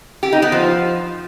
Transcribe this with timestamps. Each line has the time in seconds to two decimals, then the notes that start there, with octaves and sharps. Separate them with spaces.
0.23 G4
0.33 D#4
0.42 B3
0.52 F3